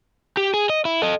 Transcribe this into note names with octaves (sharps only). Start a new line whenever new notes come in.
G4
G#4
D#5
E4
A4 D#5